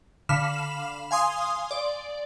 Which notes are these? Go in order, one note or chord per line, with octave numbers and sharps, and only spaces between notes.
D3 F5 B5 F6 E7
F5 G#5 C6 D#6
D5